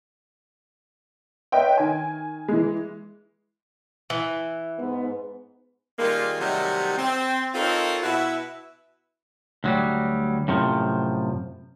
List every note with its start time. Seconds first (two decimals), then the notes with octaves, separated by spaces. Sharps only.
1.52 B4 C#5 D#5 E5 G5
1.77 D#3 G#5
2.48 E3 G#3
4.10 E3
4.79 G#2 B3
5.99 D#3 G3 G#3 A#3 F4
6.39 C3 D#3 F#3 G3 A3 D#4
6.97 C4
7.54 C4 D#4 F4 A4 A#4 C#5
8.03 B2 E4 F#4 B4 E5
9.64 D2 F#3 G3
10.48 F#2 A2 C3 F3